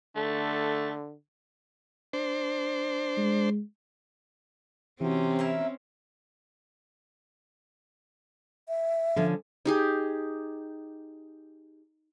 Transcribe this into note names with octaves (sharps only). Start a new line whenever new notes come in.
D3 A3
D4 C5
G#3
C3 E3 C4 C#4 F#4
E4 A#4 E5
E5
D3 F3 C#4
D#4 G4 G#4